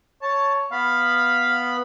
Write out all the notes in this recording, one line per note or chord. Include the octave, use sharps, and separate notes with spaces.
C#5 A5
B3 F5 B5